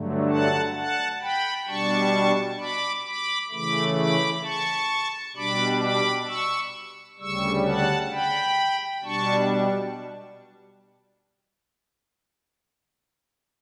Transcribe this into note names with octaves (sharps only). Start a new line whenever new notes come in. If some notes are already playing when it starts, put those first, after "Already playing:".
Already playing: G2 D3 F#3 A3
F#5 A5
F#5 A5
G5 B5
B2 G3 D4 A5 C#6
B5 D6
B5 D6
C#3 E3 A3 B5 D6
B5 D6
A5 C#6
B2 G3 D4 B5 D6
B5 D6
C#6 E6
D2 C#3 G3 C#6 E6
F#5 A5
G5 B5
B2 G3 D4 A5 C#6